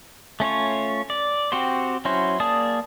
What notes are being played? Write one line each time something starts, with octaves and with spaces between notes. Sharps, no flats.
A3 C#4 F4 C#5
D5
C4 F#4 G4 C5
F#3 C#4 E4 F#4 C5
A#3 G#4 D5 A5 D#6